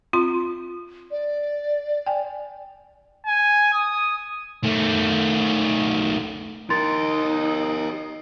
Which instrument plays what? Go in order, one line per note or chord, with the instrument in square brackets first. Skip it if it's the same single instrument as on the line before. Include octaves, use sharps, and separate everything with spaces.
[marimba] C4 F4 C6
[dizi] D5
[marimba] G5 G#5
[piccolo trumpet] G#5
D#6
[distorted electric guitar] D#3 A3
[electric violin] D#4 D#5 [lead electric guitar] G4 A#4 [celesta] C6 A6